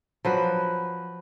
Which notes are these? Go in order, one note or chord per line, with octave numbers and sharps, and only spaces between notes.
F3 F#3 B4